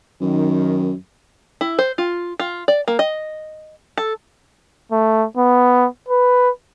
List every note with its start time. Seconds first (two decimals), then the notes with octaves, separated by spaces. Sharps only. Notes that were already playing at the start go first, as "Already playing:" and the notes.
0.21 F#2 D#3
1.61 E4
1.79 C5
1.98 F4
2.40 F4
2.68 D5
2.88 A#3
2.99 D#5
3.98 A4
4.92 A3
5.37 B3
6.08 B4